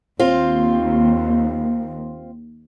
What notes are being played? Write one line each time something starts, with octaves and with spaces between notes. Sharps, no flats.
D#2 C4 F4